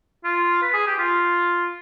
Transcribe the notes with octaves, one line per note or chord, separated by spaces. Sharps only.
F4
B4
G#4
G4
F4